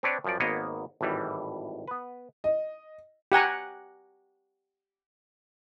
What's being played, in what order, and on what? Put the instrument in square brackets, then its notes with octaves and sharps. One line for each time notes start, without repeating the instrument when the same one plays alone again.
[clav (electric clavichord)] C4 D4 B4 C#5 D5
F#2 F3 D5
G#1 A#3 B3 C#5 D#5
G#1 A2 E3 G3
B3 B4
[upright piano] D#5
[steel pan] G4 F#5 G#5 A#5